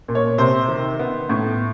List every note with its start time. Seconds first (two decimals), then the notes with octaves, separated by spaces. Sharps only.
0.08 A#2
0.15 C#5
0.38 C3 C5
0.68 D#3
0.99 B3
1.29 A2